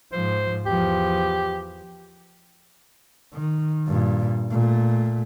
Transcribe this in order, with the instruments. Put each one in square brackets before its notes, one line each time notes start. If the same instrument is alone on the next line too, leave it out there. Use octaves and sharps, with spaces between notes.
[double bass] G#2 F3 [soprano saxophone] C5
[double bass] E2 F3 [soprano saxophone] G4
[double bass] D#3
G2 A#2
A#2 A3